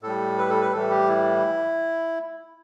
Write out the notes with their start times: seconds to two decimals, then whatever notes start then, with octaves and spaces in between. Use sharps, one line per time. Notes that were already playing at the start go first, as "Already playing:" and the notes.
0.02 A2 G3 A4
0.38 B4
0.50 A4
0.61 B4
0.73 A2 E3 G3 A4
0.90 G4
1.08 E4